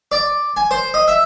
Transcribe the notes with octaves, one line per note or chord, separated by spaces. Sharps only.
D5
G#5
C5
D#5
E5